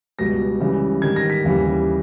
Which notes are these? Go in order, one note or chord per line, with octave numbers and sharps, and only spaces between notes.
C#2 B2 G3 A#6
C#2 C#3 E3 G3
G#2 D#3 G3 G#6
A#6
B6
D#2 C#3 E3 G3